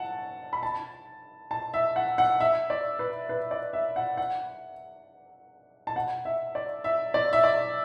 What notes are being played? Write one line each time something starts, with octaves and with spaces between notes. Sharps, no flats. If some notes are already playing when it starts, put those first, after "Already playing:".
Already playing: F#5 A5
B5
A5
A5
E5
F#5
F#5
E5
D5
B4
B4
D5
E5
F#5
F#5
A5
F#5
E5
D5
E5
D5
E5
D5